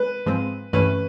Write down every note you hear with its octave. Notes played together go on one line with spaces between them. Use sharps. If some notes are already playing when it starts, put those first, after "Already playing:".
Already playing: G#3 B4
G#2 F3 G#3 C4
G2 E3 A3 C#4 B4